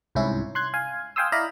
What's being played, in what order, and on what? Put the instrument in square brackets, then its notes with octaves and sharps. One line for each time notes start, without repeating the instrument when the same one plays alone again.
[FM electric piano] C2 G#2 C3 C#4 E4
C6 F#6 G#6
F5 G#5
F5 G5 G#5 C6 D#6 E6
E4 D5 D#5 F5 A#5 B5